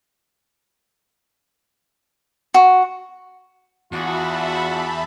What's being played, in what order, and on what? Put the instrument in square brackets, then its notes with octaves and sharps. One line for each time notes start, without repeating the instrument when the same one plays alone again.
[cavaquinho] F#4
[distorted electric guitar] E2 [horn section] D4 F4 F#4 [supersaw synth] E5 A5 B5